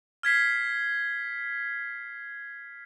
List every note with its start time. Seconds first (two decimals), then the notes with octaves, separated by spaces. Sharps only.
0.23 F6 G#6 B6 C7